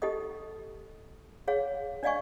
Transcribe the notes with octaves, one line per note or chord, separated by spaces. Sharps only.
D#4 G4 A4 D#5 D#6
G#4 C#5 F5
D4 D5 D#5 F5 G#5 C#6